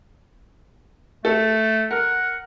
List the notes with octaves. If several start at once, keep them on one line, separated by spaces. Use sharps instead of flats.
A3 A4
A#4 F#5 F6